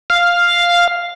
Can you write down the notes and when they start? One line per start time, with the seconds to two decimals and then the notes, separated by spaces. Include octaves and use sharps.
0.10 F5